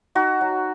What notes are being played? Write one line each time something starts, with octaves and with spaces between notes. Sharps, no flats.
D#4 F#4
F#3